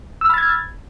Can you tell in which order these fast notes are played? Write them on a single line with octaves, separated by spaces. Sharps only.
E6 F6 B5 A6 G#6